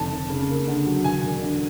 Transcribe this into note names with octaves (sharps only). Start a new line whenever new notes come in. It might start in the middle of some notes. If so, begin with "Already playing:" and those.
Already playing: F1 A5
F1
C#3
A#3
D3
F#3
E1 G#5
E1
D3